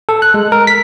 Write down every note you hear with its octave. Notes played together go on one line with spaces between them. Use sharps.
A4
F#6
G#3
A#4
B6